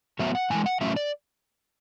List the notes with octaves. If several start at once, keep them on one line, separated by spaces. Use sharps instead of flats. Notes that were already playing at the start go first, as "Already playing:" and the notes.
A2 F#3 B3 E5
F#5
G#2 E3 G#3 G#5
F#5
A2 F#3 A3 C#4 E5
D5